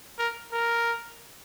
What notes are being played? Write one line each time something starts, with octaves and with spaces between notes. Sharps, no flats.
A#4
A#4